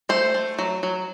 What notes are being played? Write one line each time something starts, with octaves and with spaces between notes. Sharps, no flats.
A3 C5
A3
F#3
F#3